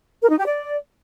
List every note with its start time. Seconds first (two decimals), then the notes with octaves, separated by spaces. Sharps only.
0.22 A#4
0.30 D#4
0.38 G4
0.46 D5